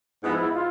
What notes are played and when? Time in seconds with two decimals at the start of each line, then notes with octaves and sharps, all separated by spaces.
0.23 G#2 F3 G#3 B3 E4
0.53 F4